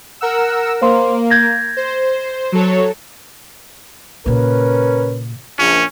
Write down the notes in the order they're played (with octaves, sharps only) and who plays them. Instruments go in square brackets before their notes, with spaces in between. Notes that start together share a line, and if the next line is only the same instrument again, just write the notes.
[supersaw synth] A#4 F#5 E6
[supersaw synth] A#3 [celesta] C5 F5 C6
[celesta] G6 G#6 A#6
[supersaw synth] C5
F#3 A4 C#5
[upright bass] A#2 C#3 [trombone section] C#4 A#4 B4
[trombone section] A#1 [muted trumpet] C#4